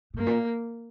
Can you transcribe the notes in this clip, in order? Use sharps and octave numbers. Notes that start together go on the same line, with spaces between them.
A#2
G2 A#3
A#2